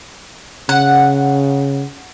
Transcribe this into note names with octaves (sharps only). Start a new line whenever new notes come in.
C#3 F#5